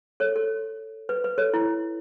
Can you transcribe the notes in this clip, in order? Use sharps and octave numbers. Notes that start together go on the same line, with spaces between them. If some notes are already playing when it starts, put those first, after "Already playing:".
A4 C#5
A4
B4
B4
A4 C#5
E4